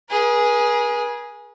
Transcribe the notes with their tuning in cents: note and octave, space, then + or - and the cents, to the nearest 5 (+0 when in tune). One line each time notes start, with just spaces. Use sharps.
G#4 +0 B4 -45